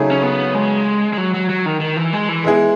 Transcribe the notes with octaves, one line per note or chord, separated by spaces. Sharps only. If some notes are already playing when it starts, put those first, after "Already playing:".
Already playing: C#3 F#3 A3 D#4 G#4
C#4
B3
G#3
G#3
F#3
F#3
F#3
D#3
D#3
E3
G#3
E3
G#3 B3 E4 G#4